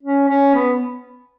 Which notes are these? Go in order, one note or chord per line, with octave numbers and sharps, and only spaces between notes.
C#4
C#4
B3